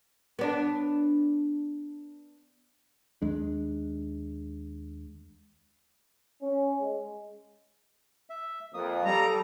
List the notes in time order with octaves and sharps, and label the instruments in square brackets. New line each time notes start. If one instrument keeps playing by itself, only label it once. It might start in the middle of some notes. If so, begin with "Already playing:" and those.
[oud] B3 D4
[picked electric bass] D#2 G#3 D4
[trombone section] C#4
G#3
[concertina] E5
[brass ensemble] F2 [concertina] A#3 D#6
[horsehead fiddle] G3 [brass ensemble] A4 [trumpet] A#5